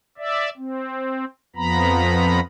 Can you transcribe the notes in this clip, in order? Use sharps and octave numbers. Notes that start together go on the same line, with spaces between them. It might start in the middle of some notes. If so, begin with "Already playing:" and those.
D5 E5
C4
F2 F3 B3 A#5 B5